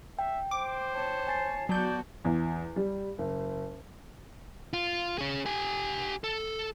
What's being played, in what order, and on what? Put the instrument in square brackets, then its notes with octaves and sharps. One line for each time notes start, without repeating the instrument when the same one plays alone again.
[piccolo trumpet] E5 [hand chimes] G5
[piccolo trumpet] C5 [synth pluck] D6
[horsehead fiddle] C#5 A5
[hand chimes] G#5 A6 C7
[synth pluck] F#3 G6 [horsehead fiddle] B3 F#4 [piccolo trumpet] D5 [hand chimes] A5
[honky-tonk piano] E2
G3
F#1
[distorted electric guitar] F4
C#4 G#4
G4 G#5
A4